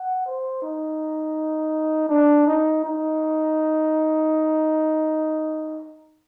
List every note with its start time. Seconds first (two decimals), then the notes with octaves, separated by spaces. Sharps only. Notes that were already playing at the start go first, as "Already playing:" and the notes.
Already playing: F#5
0.26 C5
0.62 D#4
2.09 D4
2.47 D#4
2.84 D#4